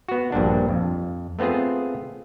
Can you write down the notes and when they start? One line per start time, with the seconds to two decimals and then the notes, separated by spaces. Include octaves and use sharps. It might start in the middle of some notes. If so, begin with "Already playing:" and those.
0.09 B3 F#4
0.32 A#1 G2 A#2 D4
0.69 F2
1.39 A3 B3 C4 F4 G#4